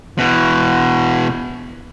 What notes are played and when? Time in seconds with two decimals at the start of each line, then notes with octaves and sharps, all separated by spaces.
0.18 B2 E3